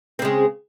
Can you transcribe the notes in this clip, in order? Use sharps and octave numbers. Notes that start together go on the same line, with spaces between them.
C#3 G#3 C4